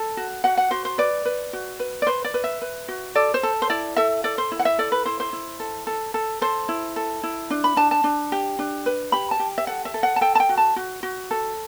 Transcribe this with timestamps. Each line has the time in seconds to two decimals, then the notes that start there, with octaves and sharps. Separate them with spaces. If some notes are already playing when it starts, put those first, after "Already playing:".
Already playing: A4
0.17 F#4
0.44 F#4 F#5
0.57 F#5
0.71 F#4 C5
0.85 C5
0.98 B4 D5
1.25 B4
1.53 F#4
1.80 B4
2.02 D5
2.07 B4 C5
2.24 D5
2.34 B4
2.44 E5
2.62 B4
2.88 F#4
3.15 A4 D5
3.34 C5
3.43 A4
3.62 C5
3.70 E4 D5
3.96 A4 E5
4.24 A4 D5
4.38 C5
4.52 E4
4.59 F#5
4.65 E5
4.79 A4 D5
4.92 B4
5.06 E4 C5
5.20 C5
5.33 E4
5.60 A4
5.87 A4
6.14 A4
6.41 A4 C5
6.69 E4
6.96 A4
7.23 E4
7.50 D4
7.64 B5
7.77 D4 A5
7.91 A5
8.04 D4
8.32 G4
8.59 D4
8.86 B4
9.12 G4 B5
9.31 A5
9.40 G4
9.58 E5
9.67 A4 F#5
9.85 E5
9.94 A4
10.03 F#5
10.16 A5
10.21 A4 G5
10.35 A5
10.40 G5
10.49 F#4
10.57 A5
10.76 F#4
11.03 F#4
11.31 A4